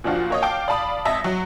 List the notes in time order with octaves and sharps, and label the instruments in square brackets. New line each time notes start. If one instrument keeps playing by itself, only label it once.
[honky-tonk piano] A#2 F3 D4 F4 F#4
A#3 C#5 D#5
F5 G5 A5 D6
D5 F5 A5 B5 D#6
G#1 D#5 E5 A5 D#6 A#6
F#3